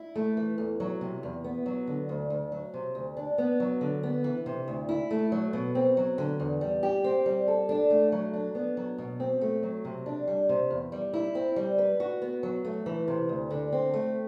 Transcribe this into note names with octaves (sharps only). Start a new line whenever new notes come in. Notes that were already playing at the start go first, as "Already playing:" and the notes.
Already playing: E4
A3
E3
E2
F#3
C3
E2
B3
F#3
D3
D2
D2
F#3
C3
D2
D4
B3
F#3
D3
B3
E3
C3
D2
E4
A3
F#3
B2
C4
F#3
D3
E2
G3
G4
C4
G3
A4
D4
A3
F#3
D4
B3
F#3
B2
C4
A3
F#3
C3
D4
G3
C3
E2
G3
E4
C4
G3
B4
F#4
B3
F#3
A3
E3
C3
D2
D3
C4
A3